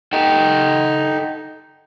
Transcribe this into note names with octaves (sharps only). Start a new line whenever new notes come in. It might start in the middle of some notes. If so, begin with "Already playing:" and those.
D#4 A4 F#5 G5